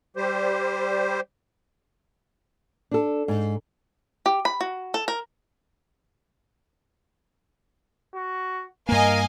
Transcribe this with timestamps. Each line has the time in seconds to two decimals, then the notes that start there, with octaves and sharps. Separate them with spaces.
0.16 G3 G4 C5
2.91 D4 A4
3.28 G#2
4.26 G4
4.45 B5
4.61 F#4
4.94 A4
5.08 A#4
8.15 F#4
8.89 G2 A#3 A#4 D#5 F5 G#5